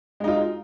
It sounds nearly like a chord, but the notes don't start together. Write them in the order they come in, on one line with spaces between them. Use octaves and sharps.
G#3 D#4 F4